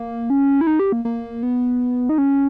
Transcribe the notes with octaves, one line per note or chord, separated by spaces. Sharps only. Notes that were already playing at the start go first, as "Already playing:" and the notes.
Already playing: A#3
C#4
E4
D#4
G4
A#3
A#3
B3
D#4
C#4